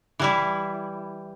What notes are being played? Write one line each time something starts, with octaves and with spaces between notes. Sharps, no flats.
E3 G3 E4